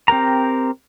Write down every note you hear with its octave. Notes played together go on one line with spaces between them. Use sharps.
C4 G4 A#4 A#5